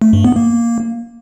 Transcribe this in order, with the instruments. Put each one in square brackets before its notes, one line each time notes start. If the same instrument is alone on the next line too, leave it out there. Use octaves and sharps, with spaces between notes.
[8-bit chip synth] A3
G2
B3
A#3